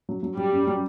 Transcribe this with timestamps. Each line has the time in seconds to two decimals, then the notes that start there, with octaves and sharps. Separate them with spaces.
0.09 F#3
0.23 F#3
0.37 F#3 G3
0.52 F#2
0.67 F#3